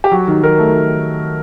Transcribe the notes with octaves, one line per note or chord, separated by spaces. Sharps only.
G4
F#3 F#4
D#3
D#3 A#4
A3